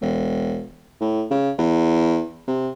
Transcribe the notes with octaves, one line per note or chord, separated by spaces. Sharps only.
E1
A2
C#3
E2
C3